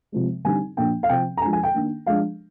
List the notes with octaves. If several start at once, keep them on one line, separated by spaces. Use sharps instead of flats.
C3 F3 G#3
D3 G3 C4 D#4 G#5
A#2 F3 A#3 D4 G5
F5
C3 F3 C4 G5
A#5
F3 G#3 D4 G#5
G#5
G5
D#3 A#3 D4
F3 G#3 D4 F5